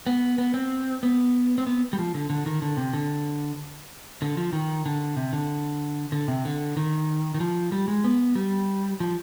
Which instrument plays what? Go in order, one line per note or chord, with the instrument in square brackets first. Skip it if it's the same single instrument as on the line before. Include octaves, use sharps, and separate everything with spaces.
[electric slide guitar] B3
B3
C4
B3
C4
B3
G3
F3
D3
D3
D#3
D3
C3
D3
D3
F3
D#3
D3
C3
D3
D3
C3
D3
D#3
D#3
F3
G3
G#3
B3
G3
F3